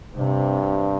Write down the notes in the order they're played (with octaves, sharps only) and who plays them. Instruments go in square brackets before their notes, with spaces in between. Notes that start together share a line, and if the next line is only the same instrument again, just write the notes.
[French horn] G2 [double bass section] C3